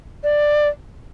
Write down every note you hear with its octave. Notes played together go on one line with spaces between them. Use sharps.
D5